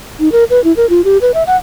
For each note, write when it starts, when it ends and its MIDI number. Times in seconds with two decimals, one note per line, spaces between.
0.20 0.32 63
0.32 0.44 70
0.50 0.63 71
0.64 0.75 64
0.77 0.89 70
0.90 1.01 65
1.05 1.18 67
1.21 1.32 71
1.34 1.43 76
1.47 1.56 78